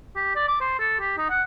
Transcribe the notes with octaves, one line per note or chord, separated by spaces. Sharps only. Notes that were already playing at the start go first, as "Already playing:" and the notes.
G4
D5
D6
C5
A4
G4
D#4
F#5